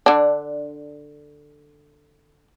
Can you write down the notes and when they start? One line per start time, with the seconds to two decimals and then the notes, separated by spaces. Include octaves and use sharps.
0.06 D3 D4